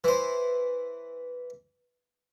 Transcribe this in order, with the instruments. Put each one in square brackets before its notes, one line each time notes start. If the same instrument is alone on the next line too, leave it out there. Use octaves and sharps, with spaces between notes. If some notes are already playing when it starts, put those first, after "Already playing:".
[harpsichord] E3 C5